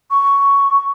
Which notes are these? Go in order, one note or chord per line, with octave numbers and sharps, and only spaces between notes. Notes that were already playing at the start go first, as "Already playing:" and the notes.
C#6